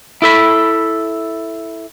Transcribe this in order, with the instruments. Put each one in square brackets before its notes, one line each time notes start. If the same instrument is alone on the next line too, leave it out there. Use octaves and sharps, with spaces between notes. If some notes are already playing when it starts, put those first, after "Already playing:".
[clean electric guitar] E4 A4 B5